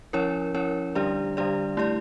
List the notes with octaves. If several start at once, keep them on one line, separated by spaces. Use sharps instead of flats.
F3 C#4 E4 A#4 C#5
F3 C#4 E4 A#4 C#5
D3 G3 D4 G4 D5
D3 G3 D4 G4 D5
A3 E4 G4 D5